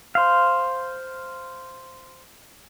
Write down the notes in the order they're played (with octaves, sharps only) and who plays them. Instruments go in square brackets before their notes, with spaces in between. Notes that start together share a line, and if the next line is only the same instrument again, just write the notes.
[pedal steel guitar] C5 F5